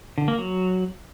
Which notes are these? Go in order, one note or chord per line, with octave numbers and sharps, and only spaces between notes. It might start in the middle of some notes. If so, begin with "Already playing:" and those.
D3
A#3
F#3